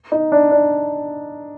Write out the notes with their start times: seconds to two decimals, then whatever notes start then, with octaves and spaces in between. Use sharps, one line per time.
0.12 D#4
0.32 D4
0.51 D4